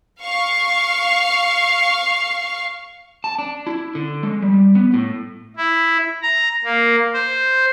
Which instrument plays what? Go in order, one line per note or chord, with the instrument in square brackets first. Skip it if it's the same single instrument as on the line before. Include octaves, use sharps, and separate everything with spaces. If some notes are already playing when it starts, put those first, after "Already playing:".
[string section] F5 C#6
[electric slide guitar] A5
D4
E4
D3
G#3
G3
B3
A2
[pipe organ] E4
A#5
A#3
C5